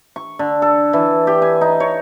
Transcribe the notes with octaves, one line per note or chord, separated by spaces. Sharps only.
C#6
D3
A4
E3
G4
G#5
D#4
C#5